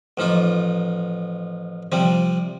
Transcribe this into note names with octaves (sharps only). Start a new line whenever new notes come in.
A1 F3 D#4 F4 D6
C3 F3 G3 C4